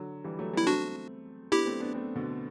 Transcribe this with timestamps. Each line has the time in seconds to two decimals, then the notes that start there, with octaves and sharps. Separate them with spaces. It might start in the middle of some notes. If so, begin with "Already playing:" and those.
Already playing: D3 F#3
0.24 E3 G3
0.39 F#3 A3
0.53 G3 B3 E4
0.66 A3 C4 D4 F#4
1.52 B3 D4 E4 G4
1.66 A3 C4
1.80 B3 D4
1.94 A3 C4
2.15 B2 D3